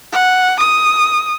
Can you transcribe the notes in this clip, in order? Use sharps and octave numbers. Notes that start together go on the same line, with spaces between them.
F#5
D#6